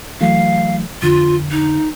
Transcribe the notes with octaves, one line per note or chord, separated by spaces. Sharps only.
E3 F#3 A3 F5
F2 D3 F4
D#4